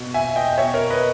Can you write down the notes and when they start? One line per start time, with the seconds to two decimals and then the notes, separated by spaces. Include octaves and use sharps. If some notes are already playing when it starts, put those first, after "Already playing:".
Already playing: B2
0.14 E5 G#5
0.36 D#5 G5
0.49 G5
0.58 B2 C#5 E5
0.74 A#4 C#5
0.90 B4 D#5